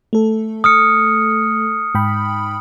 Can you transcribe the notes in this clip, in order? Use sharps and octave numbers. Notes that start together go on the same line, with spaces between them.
A3 A4
D#6 F6 C#7
G#2 G5 B5